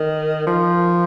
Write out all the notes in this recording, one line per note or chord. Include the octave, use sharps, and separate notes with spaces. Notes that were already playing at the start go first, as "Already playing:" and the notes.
Already playing: D#3
F3